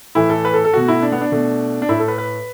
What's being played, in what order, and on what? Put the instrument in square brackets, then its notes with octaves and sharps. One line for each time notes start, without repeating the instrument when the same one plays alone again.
[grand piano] A2 E3 A3 E4
A4
B4
A4
A4
B2 A3 F#4
E4
D4
B3
D4
B2 A3
D4
A2 A3 E4
A4
B4
B4